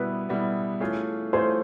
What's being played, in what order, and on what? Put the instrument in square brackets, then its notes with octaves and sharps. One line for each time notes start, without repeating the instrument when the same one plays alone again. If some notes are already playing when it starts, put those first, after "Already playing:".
Already playing: [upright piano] B2 G3 B3 E4 [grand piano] B4
[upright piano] B2 G3 B3 E4
E3 A3 C#4 F4 G#4
[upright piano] E3 A3 C#4 F4 G#4 [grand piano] C5